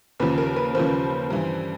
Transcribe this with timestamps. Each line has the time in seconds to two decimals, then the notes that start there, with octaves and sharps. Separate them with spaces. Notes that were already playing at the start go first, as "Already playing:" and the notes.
0.20 D#2 C#3 F3 B4
0.38 A#4
0.56 B4
0.75 D#2 C#3 F3 C5
1.30 G2 E3